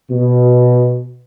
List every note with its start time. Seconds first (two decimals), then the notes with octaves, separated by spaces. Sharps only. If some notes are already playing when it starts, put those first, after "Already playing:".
0.11 B2